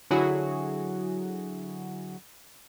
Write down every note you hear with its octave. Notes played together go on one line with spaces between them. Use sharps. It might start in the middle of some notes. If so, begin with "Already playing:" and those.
D3 F#3 E4 F#4 G#4